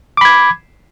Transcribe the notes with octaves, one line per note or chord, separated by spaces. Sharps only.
B5 D6 G#6